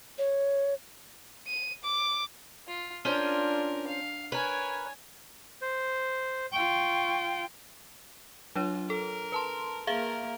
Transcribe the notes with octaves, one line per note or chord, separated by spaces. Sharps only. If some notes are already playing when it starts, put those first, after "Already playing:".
C#5
D#7
D6
F4
C#4 D4 F4 A#4 C5
F5
A#4 B4 C#5 G#5
C5
F4 G5 C#6
F#3 D4 F4 C#5
A4 A#4
B4 A5 C6
A#3 G#4 A#4 E5 F5